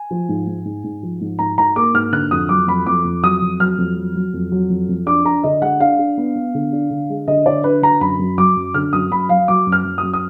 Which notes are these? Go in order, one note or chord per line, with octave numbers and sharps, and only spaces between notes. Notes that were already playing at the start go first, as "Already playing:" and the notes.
Already playing: G#5
F3
G#2
G#2
G#2
G#2
F3
G#2
G#2 A#5
G#2 A#5
A#3 D6
G#2 F6
D3 F#6
F2 D#6
F#3 D6
F2 B5
F2 D6
F2
F#3 D#6
F2
F#3 F6
F2
F#3
F#3
F2
F#3
F2
F2
D4 D6
D4 A#5
D3 D#5
G#3 F#5
D4 F5
D4
B3
B3
D3
D4
D3
G#3
D3 D#5
D3 D5
D4 B4
D3 A#5
F#2 B5
F#2
F#3 D6
F#2
D3 F6
F#2 D#6
F#2 B5
F#3 F5
F#3 D6
F#2
F6
F#2
D#6
F#2
D#6